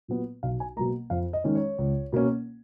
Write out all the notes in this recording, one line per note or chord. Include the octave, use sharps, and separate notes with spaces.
A#2 F#3 B3
B1 F5
G#5
B2 F#3 A#3 A#5
F2 F5
D#5
D#3 G#3 C#4
C#5
C#2
B2 A#3 C#4